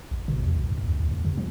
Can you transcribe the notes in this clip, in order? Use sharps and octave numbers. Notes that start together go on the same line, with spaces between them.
A#1
B2
E2
C2
F#2
D2
D2
F2
C3
F3